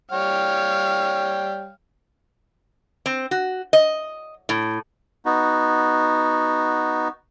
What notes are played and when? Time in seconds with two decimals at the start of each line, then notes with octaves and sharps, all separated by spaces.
0.11 G3 C#5 F5 G5
3.06 C4
3.31 F#4
3.73 D#5
4.49 A2
5.25 B3 D#4 F#4